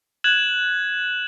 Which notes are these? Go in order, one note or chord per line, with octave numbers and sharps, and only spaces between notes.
F#6 G#6 E7 F#7